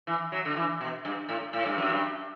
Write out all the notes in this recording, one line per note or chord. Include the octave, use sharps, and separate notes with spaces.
E3
F#3
D3
E3
B2
G2
A2
A2
G2
F#2
G2